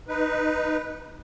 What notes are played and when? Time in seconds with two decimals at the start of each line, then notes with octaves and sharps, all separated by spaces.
0.08 D#4 B4